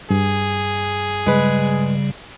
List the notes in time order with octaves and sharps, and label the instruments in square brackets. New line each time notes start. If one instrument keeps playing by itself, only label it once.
[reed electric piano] G2 [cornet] G#4
[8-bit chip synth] C#3 G3 [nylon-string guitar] G#3 B4